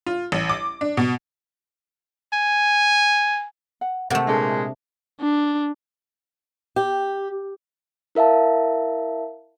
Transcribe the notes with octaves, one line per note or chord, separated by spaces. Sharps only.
F4
A1
D6
D4
B2
G#5
F#5
C3 A3 G4 A#4 F#5
A#2 G#3 D4 A4
D4
G4
E4 A#4 E5 F5 A5